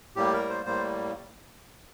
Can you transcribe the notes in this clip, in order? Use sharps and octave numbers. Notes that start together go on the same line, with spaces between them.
A2 G3 A#3 G4
A#4
C5
A2 G3 A#3 C5